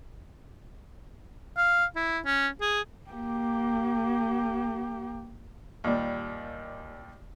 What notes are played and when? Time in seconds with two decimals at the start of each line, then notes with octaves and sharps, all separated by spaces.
1.57 F5
1.96 E4
2.25 C#4
2.61 G#4
3.11 A#3 G4
5.84 D#2 A#2 G3